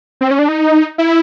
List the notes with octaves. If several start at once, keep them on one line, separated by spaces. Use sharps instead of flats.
C4
C#4
D4
D#4
E4